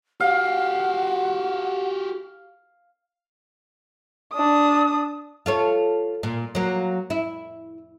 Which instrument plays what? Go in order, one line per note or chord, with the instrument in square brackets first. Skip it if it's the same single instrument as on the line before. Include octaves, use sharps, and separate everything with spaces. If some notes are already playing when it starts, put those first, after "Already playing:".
[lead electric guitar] F#4 G4 [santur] F5 [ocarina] F#5
[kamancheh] D4 D#6
[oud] F4 A4 C#5
A#2
F#3 A#3
E4